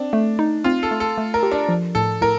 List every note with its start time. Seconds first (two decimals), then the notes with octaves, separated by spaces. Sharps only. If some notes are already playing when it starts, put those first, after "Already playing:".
Already playing: C4 D4
0.13 A3
0.39 D#4
0.64 C4 F4
0.83 A4
0.91 A3
1.00 A4
1.18 A3
1.34 A#4
1.43 G4
1.52 D4
1.69 F3
1.95 A2 A4
2.21 A2 A#4